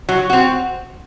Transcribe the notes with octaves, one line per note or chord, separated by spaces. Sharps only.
F#3
C4 F#4